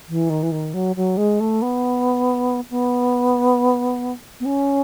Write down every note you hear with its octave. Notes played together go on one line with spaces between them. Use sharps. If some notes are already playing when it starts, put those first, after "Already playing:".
E3
D#3
E3
D#3
F#3
F#3
G#3
A3
B3
B3
B3
C#4